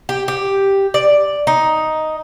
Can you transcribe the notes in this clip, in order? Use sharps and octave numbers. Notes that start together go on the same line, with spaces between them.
G4
G4
D5
D#4